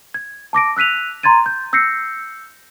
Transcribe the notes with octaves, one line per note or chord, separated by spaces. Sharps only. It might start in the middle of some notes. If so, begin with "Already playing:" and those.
G#6
A5 D6 A#6 D7
E6 F#6 B6 D#7 F7
A#5 C6 G#6 A6 D#7
G6
E6 G6 A#6 C7 C#7